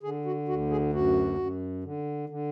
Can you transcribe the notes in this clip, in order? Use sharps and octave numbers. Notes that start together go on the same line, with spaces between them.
D3 G#4
F#4
D2 F#4
G#4
F#2 F#4
F#2
D3
D3